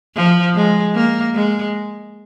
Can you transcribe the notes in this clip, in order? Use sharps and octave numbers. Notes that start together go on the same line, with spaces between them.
F3
G#3
A#3
G#3